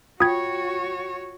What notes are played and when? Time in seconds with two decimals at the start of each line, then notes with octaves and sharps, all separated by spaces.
0.20 F4 F#4 C#5 G5 D#6 G#6